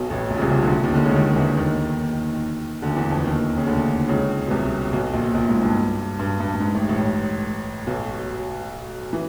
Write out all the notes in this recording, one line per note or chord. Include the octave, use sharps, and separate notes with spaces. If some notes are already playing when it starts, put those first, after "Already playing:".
Already playing: B1 B2
A1 A2
A#1 A#2
C#3
C2 C3
C2 C3
D2 D3
D#2 D#3
D2 D3
C#2 C#3
D#2 D#3
E2 E3
D#2 D#3
D2 D3
E2 E3
F2 F3
D#2 D#3
C#3
D2 D3
C#2 C#3
B2
C2 C3
B1 B2
A#1 A#2
A#1 A#2
G#2
G2
G2
G2
G2
G#2
A1 A2
A1 A2
B1 B2
E3